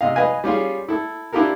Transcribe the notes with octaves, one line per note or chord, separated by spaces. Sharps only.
C3 D#5 F5
B4 D#5 F5 G#5
G3 C#4 F4 G#4
E4 A4
D4 E4 F4 G4 A4 A#4